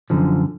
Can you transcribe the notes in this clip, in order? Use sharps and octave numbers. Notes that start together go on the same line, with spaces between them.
F#2 D3 F3